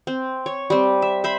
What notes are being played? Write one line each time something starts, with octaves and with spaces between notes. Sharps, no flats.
C4
C#5
G3 C4
E5
C5 E5 B5